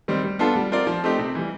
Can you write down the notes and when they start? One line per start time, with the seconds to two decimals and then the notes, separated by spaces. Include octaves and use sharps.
0.08 D#3 G3 C4
0.23 G3
0.39 B3 D4 F4 A4
0.56 G3
0.72 C4 F4 A#4 D5
0.87 F3
1.03 A3 C4 D#4 G4
1.19 C3
1.35 E3 G3